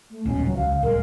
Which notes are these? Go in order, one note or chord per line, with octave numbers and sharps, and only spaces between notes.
A3
D#1 C#2 B2 C#4
F#3
C#2 F5
D#1 G#3 A#4